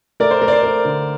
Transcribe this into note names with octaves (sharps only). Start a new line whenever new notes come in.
A3 A#4 D5
C5
A3 A#4
D5
C5
A3 A#4
D3